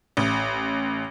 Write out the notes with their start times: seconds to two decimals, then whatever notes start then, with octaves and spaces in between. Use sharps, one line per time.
0.17 A1